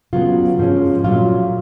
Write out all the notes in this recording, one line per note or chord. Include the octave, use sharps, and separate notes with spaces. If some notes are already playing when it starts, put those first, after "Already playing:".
C#3 F#3 B3 F4
G#2 F3 G#3 C#4
A#2 F#3 A3 C#4 F4